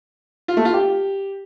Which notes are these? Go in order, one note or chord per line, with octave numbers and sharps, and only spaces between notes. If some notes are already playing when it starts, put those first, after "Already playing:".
F4
A3
F4
G4